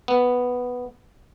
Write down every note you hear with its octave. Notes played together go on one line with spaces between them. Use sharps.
B3